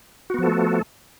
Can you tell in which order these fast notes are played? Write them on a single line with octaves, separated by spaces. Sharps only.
F#4 B3 F3 A4 A3